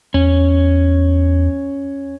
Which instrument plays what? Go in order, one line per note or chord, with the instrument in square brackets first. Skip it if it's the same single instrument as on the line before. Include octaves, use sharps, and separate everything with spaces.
[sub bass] E2 [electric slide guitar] C#4